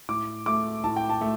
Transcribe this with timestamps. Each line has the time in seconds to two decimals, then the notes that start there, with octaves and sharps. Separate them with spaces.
0.09 A2 D6
0.46 A3 D6
0.84 A2 A5
0.96 G5
1.09 A5
1.21 A3